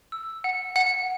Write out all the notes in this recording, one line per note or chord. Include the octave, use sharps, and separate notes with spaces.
E6
F#5
F#5